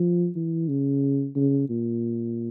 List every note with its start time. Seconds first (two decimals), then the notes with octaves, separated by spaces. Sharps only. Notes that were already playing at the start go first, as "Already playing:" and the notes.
Already playing: F3
0.35 E3
0.68 C#3
1.36 C#3
1.69 A#2